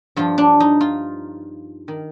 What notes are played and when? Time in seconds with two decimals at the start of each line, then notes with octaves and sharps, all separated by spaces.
0.16 G2 F3 F4
0.38 D4
0.60 D#4
0.81 F4
1.88 D#3